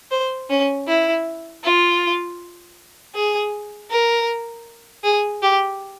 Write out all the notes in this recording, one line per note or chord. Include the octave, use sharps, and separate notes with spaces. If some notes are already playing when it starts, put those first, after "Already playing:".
C5
C#4
E4
F4
G#4
A#4
G#4
G4